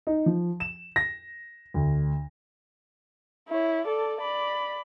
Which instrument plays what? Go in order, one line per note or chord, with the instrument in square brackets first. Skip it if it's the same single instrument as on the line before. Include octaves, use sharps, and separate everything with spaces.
[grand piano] D#4
F3
E7
A#6
D2
[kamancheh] E4 C#5
A4 D5
D5 B5